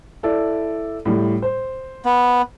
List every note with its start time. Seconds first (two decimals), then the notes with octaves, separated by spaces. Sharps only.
0.23 E4 A4 D5
1.06 A2 G3
1.42 C5
2.05 B3